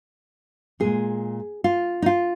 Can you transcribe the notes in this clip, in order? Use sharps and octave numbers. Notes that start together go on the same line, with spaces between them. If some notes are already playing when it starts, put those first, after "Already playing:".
A#2 G#3 G#4
F4
D#4
F4